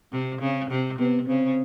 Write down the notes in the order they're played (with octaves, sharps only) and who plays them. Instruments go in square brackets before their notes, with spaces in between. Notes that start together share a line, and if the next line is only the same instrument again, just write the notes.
[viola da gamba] C3 [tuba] C4
[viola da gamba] C#3 [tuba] C4
[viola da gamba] C3
[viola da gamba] C3 [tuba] B3
[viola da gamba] C#3 [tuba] C4